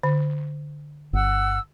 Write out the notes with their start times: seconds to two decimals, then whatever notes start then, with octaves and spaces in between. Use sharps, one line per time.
0.03 D3
1.13 G1 F#5 E6